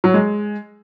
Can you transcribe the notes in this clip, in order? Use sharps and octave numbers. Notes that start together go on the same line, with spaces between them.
F#3
G#3